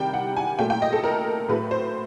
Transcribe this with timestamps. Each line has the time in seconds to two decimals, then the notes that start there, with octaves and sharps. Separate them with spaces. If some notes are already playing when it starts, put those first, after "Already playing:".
Already playing: C3 D#3 G3 G5
0.13 F#5
0.37 G#5
0.59 A#2 F#3 A3 G5
0.70 G5
0.82 D#5
0.93 A4
1.04 A#4
1.49 A2 F#3 A3 B4
1.71 C5